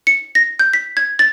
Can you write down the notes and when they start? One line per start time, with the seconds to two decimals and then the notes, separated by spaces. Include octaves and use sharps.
0.07 C#7
0.35 A#6
0.59 G6
0.73 B6
0.97 G#6
1.19 A6